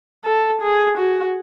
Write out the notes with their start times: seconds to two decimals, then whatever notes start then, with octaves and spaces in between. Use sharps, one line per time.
0.25 A4
0.62 G#4
0.98 F#4